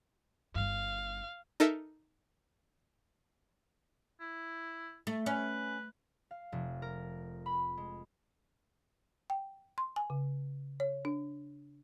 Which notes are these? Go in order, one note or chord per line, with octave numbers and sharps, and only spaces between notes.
G1 G2 F5
D#4 A4 A#4 E5
E4
A3
C#4 B4
F5
F1
A#4
B5
G#3
G5
C6
G#5
C#3
C#5
D4